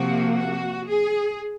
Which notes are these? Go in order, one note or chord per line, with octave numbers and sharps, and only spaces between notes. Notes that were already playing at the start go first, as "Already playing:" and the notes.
Already playing: C3 F3 A#3 F#4
F#4
G#4